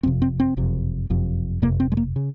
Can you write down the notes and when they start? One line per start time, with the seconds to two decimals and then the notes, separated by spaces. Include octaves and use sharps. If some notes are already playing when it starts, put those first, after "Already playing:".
0.03 F#1 F2 C3 C4
0.22 C4
0.40 C4
0.57 F#1 F2 C3
1.10 F#1 F2 C3
1.62 F#1 F2 C3 A#3
1.80 C4
1.92 G#3
1.97 A#3
2.16 C#3